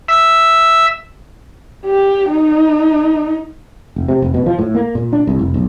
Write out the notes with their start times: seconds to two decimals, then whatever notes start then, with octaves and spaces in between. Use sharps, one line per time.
0.08 E5
1.86 G4
2.29 D#4
3.96 F1
4.08 C3
4.22 F1
4.34 B2
4.46 F3
4.59 A2
4.75 A#3
4.95 A#2
5.13 D4
5.27 C2
5.39 F1
5.54 B1